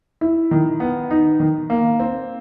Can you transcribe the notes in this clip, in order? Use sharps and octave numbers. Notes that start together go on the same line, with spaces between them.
E4
D#3
B3
D#4
D#3
A#3
C4